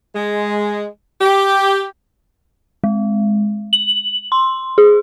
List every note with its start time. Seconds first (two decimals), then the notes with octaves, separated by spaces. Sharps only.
0.15 G#3
1.21 G4
2.84 G#3
3.73 F#7
4.32 C6
4.78 G#4